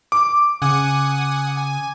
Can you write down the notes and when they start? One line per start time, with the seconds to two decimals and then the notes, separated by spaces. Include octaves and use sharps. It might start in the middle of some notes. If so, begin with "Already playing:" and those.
0.12 D6
0.62 C#3 F#5 G#5 D#6
1.57 G#5